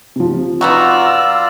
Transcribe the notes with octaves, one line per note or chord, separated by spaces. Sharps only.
C3 F3
B3 D#4 F4 F#4 D5 A#5 E6